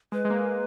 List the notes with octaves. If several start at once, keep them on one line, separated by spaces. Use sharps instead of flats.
G#3 B4
G#3
A#3